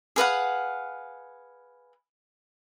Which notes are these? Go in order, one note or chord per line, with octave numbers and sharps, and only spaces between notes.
G#4 B4 F5 F#5